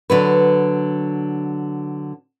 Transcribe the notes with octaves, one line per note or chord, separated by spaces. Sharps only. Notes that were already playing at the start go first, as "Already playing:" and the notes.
D3 F#3 B4